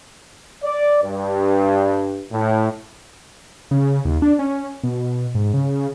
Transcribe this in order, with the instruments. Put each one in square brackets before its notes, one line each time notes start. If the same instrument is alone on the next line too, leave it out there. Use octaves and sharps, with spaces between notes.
[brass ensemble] D5
G2
A2
[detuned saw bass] C#3
D#2
D4
C#4
B2
G#2
C#3